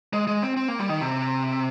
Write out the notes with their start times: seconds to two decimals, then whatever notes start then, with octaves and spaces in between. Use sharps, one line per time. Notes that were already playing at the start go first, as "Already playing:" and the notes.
0.13 G#3
0.27 G#3
0.42 C4
0.57 C4
0.68 A#3
0.79 G3
0.89 D#3
1.01 C3